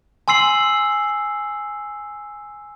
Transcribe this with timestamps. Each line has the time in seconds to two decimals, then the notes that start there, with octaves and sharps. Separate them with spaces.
0.28 G#5 C6 E6 C7 F#7